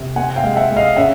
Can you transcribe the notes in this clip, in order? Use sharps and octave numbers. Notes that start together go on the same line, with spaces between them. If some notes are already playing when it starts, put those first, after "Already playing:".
Already playing: C3
C4 F#5 G#5
F5 G5
G#3
E5 F#5
G#3
D#5 F5
C#3 E5 F#5